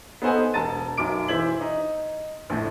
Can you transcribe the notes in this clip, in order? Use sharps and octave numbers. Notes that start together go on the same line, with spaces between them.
B3 D#4 A4 C5 F#5 G#5
E1 A5 A#5 A6 D#7
B1 F#2 D6 D7
E3 C5 E5 G#6 F#7
D#4
A#1 F2 A2